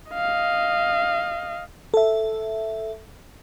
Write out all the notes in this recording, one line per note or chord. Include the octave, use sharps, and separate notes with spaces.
D#5 F5
A4 E5